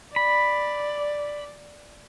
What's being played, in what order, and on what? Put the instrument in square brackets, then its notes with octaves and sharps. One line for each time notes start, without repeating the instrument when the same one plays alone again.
[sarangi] D5 [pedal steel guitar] B5